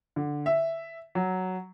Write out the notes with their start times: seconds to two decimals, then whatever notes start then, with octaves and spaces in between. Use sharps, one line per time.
0.16 D3
0.46 E5
1.15 F#3